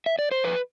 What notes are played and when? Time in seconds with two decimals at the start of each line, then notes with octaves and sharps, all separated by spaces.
0.06 E5
0.19 D5
0.31 C5
0.44 F2 B4